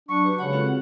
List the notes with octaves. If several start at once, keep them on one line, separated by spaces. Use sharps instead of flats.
F#3 D4 C#6
F#4 G4 B4
C#3 G#3 C#5 F#5 B5
C4 F4 A4
F#4 C#5